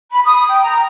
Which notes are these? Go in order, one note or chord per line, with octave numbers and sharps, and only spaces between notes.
B5
D#6
G5
A#5